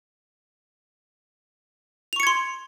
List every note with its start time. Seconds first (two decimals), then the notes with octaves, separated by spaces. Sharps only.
2.13 F7
2.16 C#6
2.20 C#7
2.23 G#6
2.27 C6